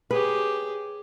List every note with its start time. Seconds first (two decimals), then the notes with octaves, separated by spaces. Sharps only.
0.11 G4 G#4 B4 C#5